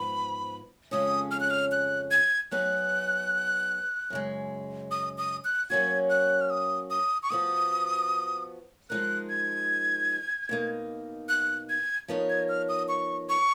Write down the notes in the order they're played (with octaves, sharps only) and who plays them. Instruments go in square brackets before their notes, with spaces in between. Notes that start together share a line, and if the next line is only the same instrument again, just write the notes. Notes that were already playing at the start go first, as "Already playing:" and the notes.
Already playing: [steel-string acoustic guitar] G#2 F3 B3 [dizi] B5
[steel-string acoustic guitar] F2 C#3 G#3 C#4 [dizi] D#6
[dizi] F6
F#6
F6
F#6
G#6
[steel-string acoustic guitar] F#3 B3 D#4 G#4 [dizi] F#6
[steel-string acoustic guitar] F#2 C#3 G#3
[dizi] D#6
D#6
F#6
[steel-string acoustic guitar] F#3 A#3 C#4 F#4 [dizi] G#6
[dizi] F#6
F6
D#6
D#6
C#6
[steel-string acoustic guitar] F3 B3 F#4 [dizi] D#6
[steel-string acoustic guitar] F3 G#3 D#4 A#4 [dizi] F#6
[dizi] G#6
[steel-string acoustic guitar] B2 A#3 D#4
[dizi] F#6
G#6
[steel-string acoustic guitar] F3 B3 D#4 A#4 C#5
[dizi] G#6
F6
D#6
C#6
C#6